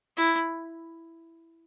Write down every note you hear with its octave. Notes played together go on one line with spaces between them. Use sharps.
E4